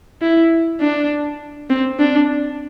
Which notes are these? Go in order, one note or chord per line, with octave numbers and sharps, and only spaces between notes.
E4
D4
C4
D4